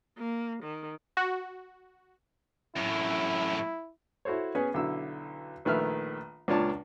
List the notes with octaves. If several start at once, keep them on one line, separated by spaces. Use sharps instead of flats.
A#3
D#3
F#4
F#2 A2 E4
E4 F#4 A4 C5 C#5
B3 C#4 G#4 B4
B1 D3 E4 E6
A#1 D#3 A3 B4 E5 F6
C#2 A#2 D4 F4 C#5 A5